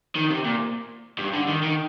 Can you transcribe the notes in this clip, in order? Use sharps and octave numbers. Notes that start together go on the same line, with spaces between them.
D#3
C3
A#2
G2
D3
D#3
D#3